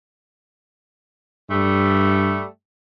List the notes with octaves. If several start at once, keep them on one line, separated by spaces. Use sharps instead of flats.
G2 G3 A3